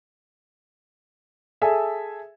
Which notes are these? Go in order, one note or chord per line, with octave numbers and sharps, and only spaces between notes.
G#4 A4 E5 G#5